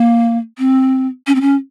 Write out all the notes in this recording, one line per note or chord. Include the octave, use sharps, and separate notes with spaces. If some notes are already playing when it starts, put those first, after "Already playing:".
Already playing: A#3
C4
C#4
C4
C#4